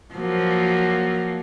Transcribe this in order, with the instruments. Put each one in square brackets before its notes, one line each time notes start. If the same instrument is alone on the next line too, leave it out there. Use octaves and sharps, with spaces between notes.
[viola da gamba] F3 F#3 A#3